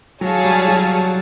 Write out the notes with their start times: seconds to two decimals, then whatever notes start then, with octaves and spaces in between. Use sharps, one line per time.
0.21 F#3 G#4 C#5 F5 A5
0.45 G3
0.68 F#3